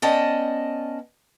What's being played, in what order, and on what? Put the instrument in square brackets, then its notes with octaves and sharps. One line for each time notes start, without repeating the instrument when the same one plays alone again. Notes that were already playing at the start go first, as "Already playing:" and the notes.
[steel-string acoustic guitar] B3 C#4 D5 D#5 G5 A5